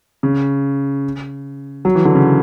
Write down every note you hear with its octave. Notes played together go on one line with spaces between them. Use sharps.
C#3
F#3
E3
D3
C#3